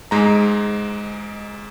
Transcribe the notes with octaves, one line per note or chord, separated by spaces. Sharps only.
G#2 G#3 A#5